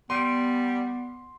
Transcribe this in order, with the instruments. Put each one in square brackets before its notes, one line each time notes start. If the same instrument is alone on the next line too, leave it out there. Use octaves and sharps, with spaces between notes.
[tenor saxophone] G3 [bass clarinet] B3 [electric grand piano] C6